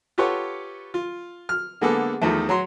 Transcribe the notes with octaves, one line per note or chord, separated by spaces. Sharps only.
F4 G4 A4 B4 C#5 F#5
F4
F6
D3 G#3 A#3 B3 G#4 A4
E2 D#3 F3 A3
F#3 A#5 C6